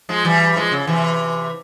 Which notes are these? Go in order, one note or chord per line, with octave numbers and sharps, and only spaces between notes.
F3 G#3
E3 G3
F3 G#3
C#3
C3 E3